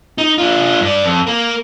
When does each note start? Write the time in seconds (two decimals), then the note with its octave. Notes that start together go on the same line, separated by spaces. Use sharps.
0.18 D#4
0.38 D4 F4
0.81 G2 D5
1.05 F2
1.27 A#3 A#4